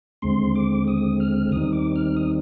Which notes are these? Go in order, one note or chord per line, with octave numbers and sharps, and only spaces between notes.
D#2 D3 G#3 C4 C6
D6
D#6
F6
D#2 D#3 G3 C4 D#4 D#6
D6
F6
D#6